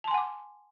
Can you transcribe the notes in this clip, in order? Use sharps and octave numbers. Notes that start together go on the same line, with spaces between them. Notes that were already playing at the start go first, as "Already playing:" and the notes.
F#5 G#5 A5 C6 D6